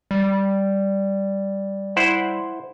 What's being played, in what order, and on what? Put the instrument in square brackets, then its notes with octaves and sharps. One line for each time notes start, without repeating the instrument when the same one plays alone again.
[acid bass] G3
[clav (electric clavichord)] E4 C5 F#5